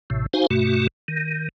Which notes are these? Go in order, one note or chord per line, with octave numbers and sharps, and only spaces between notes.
A1 A2 C3
D#4 F#4 C5 F5 G#5
G2 B2 A3 F#4
D#3